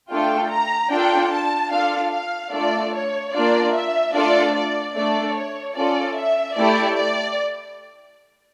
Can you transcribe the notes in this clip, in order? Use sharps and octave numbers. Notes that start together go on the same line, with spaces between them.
A3 D4 F4 A4 G5
A#5
D4 F4 A4 G5
A5
D4 F4 A4 F5
F5
A3 D4 F4 A4 D5
C#5
A#3 D4 F4 D5
E5
A3 D4 F4 A4 D5
D5
A3 D4 A4 D5
C#5
C#4 F4 A4 D5
E5
A3 E4 G4 D5
D5